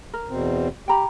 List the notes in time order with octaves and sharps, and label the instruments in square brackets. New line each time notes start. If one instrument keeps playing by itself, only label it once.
[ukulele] A#4
[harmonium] E2 B2 C4
[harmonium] G4 [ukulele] G5 A#5 B5